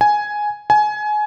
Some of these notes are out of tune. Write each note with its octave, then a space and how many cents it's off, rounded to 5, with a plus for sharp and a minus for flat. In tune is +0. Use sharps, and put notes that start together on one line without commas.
G#5 +5
G#5 +25